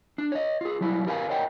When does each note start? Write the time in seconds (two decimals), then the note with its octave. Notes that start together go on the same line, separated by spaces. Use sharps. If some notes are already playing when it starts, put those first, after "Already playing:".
0.18 D4
0.32 C#5 D#5
0.61 F4 G#4
0.81 F#3 G3 E4
1.07 G4 A#4 B4 F5 F#5 G#5
1.29 A#4 C#5 D#5 F#5 G5